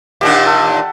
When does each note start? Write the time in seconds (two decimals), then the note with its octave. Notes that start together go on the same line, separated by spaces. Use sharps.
0.21 D#2 A#2 D4 G4 F#5
0.46 A4